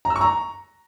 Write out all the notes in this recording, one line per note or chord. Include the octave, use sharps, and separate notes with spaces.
A#5
E6
C#6
A#5